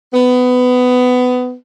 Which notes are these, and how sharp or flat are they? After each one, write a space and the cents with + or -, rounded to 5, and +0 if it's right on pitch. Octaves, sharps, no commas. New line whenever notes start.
B3 +20